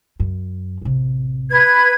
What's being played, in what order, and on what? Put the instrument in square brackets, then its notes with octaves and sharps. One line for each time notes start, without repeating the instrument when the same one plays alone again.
[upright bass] F#2
A1 C3
[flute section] B4 G#6